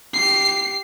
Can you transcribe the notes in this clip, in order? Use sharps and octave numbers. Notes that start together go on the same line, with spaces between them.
G4 C7